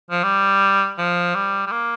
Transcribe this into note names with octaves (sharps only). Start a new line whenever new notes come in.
F3
G3
F3
G3
G3
A#3